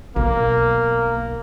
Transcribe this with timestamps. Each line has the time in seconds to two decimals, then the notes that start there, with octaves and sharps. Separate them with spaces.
0.16 B1 A#3